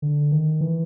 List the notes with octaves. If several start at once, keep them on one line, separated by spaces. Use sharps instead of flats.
D3
D#3
E3